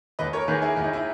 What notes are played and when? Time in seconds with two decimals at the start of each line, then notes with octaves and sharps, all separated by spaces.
0.19 D#2 B4 D#5
0.33 A#4 C#5
0.48 D#3 A#3 G#4 B4
0.62 E4 G#4
0.76 D#2 E4
0.84 D#4
0.93 E4